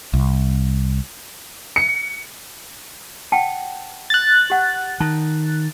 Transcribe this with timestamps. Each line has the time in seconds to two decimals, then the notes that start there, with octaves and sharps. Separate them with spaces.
0.14 C2
1.76 C#7
3.32 F#5 G5 A5
4.10 F#6 A6
4.50 G4 F#5
5.00 D#3 A5